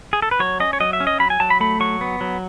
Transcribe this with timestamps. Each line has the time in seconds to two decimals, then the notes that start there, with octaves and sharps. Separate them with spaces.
0.13 G#4
0.22 A4
0.31 B4
0.40 F#3 C#5
0.60 C#4 D#5
0.73 C#5
0.80 F#3 D#5
0.93 E5
1.00 C#4
1.07 D#5
1.20 F#3 B5
1.30 G#5
1.40 F#3 A5
1.50 B5
1.60 A3 B5
1.80 F#3 C#6
2.01 B3
2.21 F#3